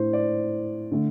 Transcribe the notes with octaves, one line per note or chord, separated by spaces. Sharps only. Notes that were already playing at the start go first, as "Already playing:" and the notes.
Already playing: A2 D4 C5
D5
D3 A3